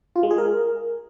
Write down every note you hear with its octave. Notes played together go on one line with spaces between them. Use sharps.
F4
G#3
G#4
A#4